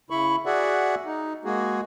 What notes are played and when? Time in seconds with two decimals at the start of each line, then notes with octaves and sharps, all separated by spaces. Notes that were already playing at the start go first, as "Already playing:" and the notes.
0.10 C#3 E4 B5 C#6
0.46 F#4 G#4 D5 E5 F#5
1.06 D#4
1.45 G#3 A#3 F#4 G#4